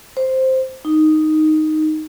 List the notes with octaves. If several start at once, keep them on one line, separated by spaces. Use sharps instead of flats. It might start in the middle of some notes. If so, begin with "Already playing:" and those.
C5
D#4